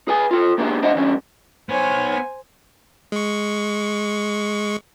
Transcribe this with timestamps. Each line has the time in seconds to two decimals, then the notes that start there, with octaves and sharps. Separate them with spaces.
0.08 G#4 B4 G#5
0.31 F4 A4
0.58 A#3 B3 D4 F4 G4 G#4
0.82 D4 C5 D#5 F5 F#5
0.95 D3 E3 G3 C#4
1.69 B3 C5 C#5 G#5
3.12 G#3 C#6